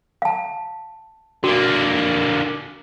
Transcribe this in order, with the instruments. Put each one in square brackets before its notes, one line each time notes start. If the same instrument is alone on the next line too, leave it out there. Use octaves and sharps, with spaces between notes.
[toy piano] F5 A5
[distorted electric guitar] D3 A#3 [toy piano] F#4